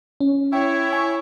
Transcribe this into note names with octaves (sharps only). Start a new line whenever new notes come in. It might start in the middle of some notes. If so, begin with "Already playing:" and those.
C#4
E4 C#5 G5
G#5 C#6